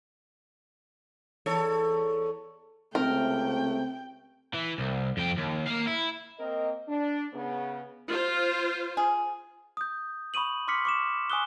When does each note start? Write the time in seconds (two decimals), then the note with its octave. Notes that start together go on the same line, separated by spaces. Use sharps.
1.46 E2 A4 C#5
2.95 C#2 C3 A3 C4 A#4 G5
4.54 E3
4.80 C2
5.17 F2 G5
5.37 D#2
5.67 A#3 F5
5.87 E4
6.39 A#3 C4 A#4 D#5
6.88 D4
7.33 C#3 B3
8.08 F4 C5
8.97 G#4
9.77 D#6 G6
10.34 B5 C#6 D#6 D#7 F#7
10.68 C6 D6 F6 B6 C#7
10.85 C#6 D6 E7
11.30 G#5 C#6 D#6 F#6 G7